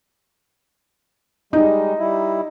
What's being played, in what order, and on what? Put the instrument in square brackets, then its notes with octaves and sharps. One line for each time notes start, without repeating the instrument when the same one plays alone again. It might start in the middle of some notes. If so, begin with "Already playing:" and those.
[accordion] G3 G#3 [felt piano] D#4
[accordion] G3 E4